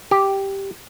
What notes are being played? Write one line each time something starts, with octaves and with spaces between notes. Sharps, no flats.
G4